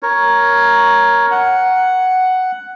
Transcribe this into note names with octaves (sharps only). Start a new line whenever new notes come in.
A#4 C#5
F#5